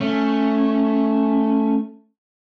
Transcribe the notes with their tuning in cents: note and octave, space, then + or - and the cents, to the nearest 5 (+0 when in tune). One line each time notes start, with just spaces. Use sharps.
A3 +0 C#4 +0